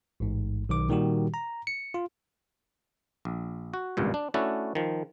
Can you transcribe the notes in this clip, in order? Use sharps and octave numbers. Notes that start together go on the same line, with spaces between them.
A1 G#2
B1 D#3 D6
A#2 D#3 G3 F#4 G4
A#5
C#7
F4
A#1
F#4
G#1 C#2 G2 A#2
D4
A3 C#4 D4 E4 F#4 A4
D#3 F3